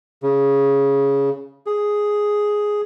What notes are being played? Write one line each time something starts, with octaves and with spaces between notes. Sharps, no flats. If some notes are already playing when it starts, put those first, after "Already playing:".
C#3
G#4